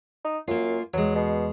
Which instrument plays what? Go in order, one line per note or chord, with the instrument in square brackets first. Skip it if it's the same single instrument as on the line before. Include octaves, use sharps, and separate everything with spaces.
[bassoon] D#4
[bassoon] F#2 [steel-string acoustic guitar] A#3 F4
[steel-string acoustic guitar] E2 G#3 [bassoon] F#3
[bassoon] B2